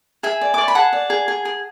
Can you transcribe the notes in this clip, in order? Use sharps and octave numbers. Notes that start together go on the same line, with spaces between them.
G#4 E5 G#5
D5
D6
D5 C#6
B5
G#4 F#5 A5
D5
G#4
G#4
G#4